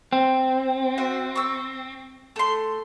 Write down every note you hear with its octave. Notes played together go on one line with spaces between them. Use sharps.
C4
F#4 C5 E5
C#6 E6
A3 C6